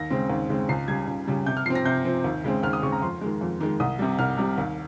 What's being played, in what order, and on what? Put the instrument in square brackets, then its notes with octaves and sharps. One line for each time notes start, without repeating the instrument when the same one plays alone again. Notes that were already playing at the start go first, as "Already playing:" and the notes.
Already playing: [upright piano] D#2 A#6
C#3 G#3 C4
D#2
C#3 G#3 C4
C#2 C7
C#3 G3 G#6
C#2
C#3 G3
C3 G6
F6
F3 C7
C4
A#6
C3 G6
F3 C4
D#2
C#3 G#3 C4
D#2 F6
D#6
C#3 G#3 C4 C#6
A#5
F2 C6
D#3 G#3
F2
D#3 G#3
C2 D#6
C3 G3
C2 F6
C3 G3
D#2